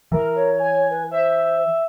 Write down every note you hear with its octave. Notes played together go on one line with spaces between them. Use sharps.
E3 A#4
C#5
G#5
B4
C5 E5